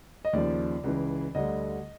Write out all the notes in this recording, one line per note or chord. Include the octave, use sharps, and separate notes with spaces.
D#5
D#2 C#3 F3 D5
C#2 C#3 E3
D2 D3 G3 D#5